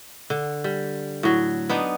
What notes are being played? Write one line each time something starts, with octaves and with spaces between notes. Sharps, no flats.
D3
G3
A2 F#3
B3 D4 D#4